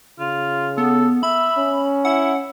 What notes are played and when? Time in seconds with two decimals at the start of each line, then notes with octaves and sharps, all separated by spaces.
0.19 C#3 F4
0.78 B3 A4
1.23 E5 B5
1.58 C#4
2.05 E4 F#5